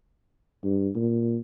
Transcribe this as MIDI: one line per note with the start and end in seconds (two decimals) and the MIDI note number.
0.64 0.90 43
0.95 1.38 46